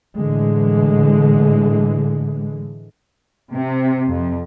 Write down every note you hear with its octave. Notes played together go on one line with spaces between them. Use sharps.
A2 D3 E3 G#3
C3
F2